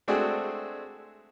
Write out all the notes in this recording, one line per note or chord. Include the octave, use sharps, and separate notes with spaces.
G#3 A3 C4 D4 F#4 G#4